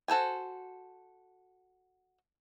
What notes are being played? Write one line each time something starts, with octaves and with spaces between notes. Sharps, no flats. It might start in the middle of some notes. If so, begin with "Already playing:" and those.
F#4 A4 C5 G#5